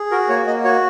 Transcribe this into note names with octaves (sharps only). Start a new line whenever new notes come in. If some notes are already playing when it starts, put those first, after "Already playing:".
Already playing: G#4
F#4 A#4
A#3 C#5
A#3 D#5
F#4 C#5